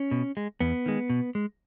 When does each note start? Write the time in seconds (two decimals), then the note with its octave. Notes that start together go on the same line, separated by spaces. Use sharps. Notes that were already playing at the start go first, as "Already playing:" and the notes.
Already playing: C#4
0.11 B2
0.37 G#3
0.61 E2 B3
0.86 D#3 G#3
1.10 B2
1.35 G#3